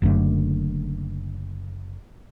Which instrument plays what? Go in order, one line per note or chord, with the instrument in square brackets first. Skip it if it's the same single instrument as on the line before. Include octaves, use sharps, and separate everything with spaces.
[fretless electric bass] F#1 F#2 D3 A3